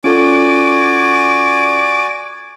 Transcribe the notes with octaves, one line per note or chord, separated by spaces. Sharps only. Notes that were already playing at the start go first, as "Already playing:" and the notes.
C#4 F4 F#4 A4 D5 G#5 D6